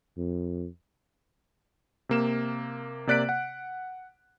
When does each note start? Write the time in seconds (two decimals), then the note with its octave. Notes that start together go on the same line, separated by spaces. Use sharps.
0.17 F2
2.09 C3 A#3 E7
3.07 C3 A#3 D5 F#6 B6 D7
3.29 F#5